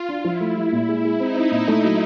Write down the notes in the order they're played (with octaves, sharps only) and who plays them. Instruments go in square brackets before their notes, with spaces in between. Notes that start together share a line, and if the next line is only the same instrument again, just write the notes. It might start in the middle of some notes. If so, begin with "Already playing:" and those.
Already playing: [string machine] F4
[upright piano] D4
[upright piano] F3 [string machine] E4
[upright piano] A3
[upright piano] G3 [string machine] E4
[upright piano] A#2
G#3
G#3
[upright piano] C4 [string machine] D#4
[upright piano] C4
A#2
A3
F#3